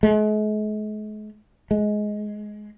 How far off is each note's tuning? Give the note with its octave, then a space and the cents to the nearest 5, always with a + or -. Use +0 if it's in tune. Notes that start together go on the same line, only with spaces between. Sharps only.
G#3 +45
G#3 +15